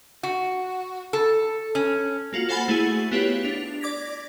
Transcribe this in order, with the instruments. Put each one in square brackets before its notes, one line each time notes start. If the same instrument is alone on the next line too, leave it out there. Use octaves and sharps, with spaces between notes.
[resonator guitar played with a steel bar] F#4
A4
C#4
[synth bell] A#3 F4 F#4
A4 C5 F#5 G#5 B5 A6
A3 E4 F#4 G#4
B3 E4 F4 G4 B4 C#5
D4 F7
D5 D6 G#6 A#6 B6